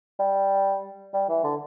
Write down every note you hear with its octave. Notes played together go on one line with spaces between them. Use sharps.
G3
G3
E3
D3